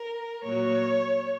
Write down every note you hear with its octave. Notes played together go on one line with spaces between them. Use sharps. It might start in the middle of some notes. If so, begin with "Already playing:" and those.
Already playing: A#4
A#2 F#3 C#5